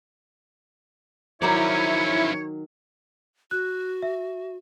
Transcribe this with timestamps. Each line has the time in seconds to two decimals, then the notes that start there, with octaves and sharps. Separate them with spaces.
1.42 D#3 F3 F#3 C#4 E4 C#5 D5
3.51 F#4 F#6
4.03 E5